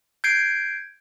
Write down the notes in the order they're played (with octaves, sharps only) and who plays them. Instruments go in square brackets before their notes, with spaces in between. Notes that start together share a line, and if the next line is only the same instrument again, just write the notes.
[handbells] G6 G#6 C7 D7